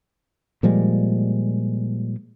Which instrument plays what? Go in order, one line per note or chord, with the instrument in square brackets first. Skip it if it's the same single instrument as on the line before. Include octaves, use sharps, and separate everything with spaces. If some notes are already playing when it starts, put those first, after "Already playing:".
[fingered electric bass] A#2 F3 G3 G#3